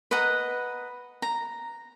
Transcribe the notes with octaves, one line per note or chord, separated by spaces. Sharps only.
B4 D#5 F#5 A#5
A#5